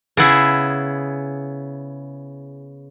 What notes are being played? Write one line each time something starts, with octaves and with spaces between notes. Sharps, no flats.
C#3 B3 E4 G#4